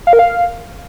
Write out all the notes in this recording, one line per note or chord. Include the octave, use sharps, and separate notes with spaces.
F5
A#4
F5